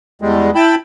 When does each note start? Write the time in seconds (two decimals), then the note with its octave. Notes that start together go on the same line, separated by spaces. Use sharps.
0.22 E2 G3 G#3
0.55 E4 G5 A5 B5